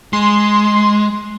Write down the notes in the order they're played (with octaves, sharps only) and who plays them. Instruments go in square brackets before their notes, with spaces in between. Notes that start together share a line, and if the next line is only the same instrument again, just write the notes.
[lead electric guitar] G#3 [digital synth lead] C6